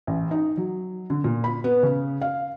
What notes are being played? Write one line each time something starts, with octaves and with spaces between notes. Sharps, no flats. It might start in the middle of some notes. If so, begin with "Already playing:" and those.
A1
D#4
F#3
D3
A#2
B5
B3
C#3
F5